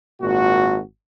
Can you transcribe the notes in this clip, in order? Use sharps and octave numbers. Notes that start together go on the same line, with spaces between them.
G#1 A#2 F#4